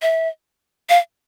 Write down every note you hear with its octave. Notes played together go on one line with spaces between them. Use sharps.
E5
F5